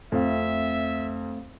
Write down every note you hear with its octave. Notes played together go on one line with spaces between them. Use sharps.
F2 A3 C4 E5 F5